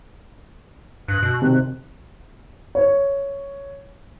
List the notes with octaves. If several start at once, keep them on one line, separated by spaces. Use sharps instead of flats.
G2 F#6
B2
C3 D#3
C#5